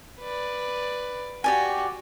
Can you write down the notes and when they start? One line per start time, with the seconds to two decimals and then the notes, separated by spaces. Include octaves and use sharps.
0.20 B4 D5
1.44 F#4 G4 D5 G#5